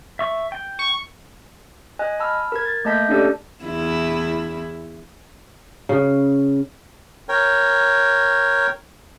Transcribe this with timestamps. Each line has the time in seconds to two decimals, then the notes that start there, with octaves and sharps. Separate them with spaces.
0.19 E5 C#6
0.52 G5
0.79 C#6
1.99 D#5 G#5 F#6
2.20 A5 B5 E6 F6
2.52 A#4 G#6
2.65 A6
2.85 A3 A#3 D#5 A5 G6 B6
3.09 C#4 D4 G4 A4 D5 A5
3.64 E2 E4
5.89 C#3
7.29 A#4 C#5 G5